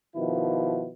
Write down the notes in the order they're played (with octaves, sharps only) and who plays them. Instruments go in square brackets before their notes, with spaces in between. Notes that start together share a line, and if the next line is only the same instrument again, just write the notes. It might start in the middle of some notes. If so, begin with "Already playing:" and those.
[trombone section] B2 D#3 F3 E4